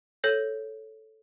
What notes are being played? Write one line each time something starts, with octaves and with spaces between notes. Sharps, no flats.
A4 C#5 G6 A#6